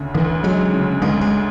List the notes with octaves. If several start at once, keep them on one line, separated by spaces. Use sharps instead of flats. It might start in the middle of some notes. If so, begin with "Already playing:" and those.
Already playing: D2 C#3
D2 E3
F#3 G#3
C#3
D2 G#3
G#3